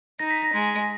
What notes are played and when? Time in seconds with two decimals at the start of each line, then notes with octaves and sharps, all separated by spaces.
0.19 D#4 A#6
0.31 B6
0.42 A#6
0.53 G#3